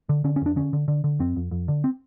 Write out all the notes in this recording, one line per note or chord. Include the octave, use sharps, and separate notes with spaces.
D3
D3 C#4
C#4
F2 D4
D3 C#4
D3
D3
D3
F2 C4
F2
F2
D3
C4